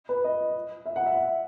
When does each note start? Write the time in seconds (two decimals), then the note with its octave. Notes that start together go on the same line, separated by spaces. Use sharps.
0.09 B4
0.24 D#5
0.86 E5
0.96 F#5
1.06 E5